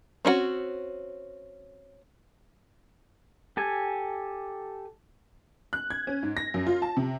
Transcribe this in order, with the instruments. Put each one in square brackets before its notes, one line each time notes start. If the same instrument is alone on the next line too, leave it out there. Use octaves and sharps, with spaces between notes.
[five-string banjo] C4 C#4 D#4 F#4
[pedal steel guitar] G4 A4 G#5
[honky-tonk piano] F#6
G#6
C#4
G#2
A#6
F#2
F4
A5
C3